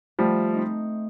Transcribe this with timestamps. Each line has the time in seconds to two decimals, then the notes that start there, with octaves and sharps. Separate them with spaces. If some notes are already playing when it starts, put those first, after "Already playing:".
0.19 F3 G3 A3
0.54 C4 D#4